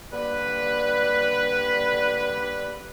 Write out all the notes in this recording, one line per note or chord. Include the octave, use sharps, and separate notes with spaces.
D3 G3 A#3 B4